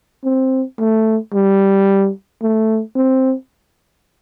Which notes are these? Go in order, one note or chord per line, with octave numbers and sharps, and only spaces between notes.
C4
A3
G3
A3
C4